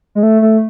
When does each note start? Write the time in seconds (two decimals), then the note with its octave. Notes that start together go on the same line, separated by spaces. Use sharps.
0.15 G#3
0.23 A3
0.42 A3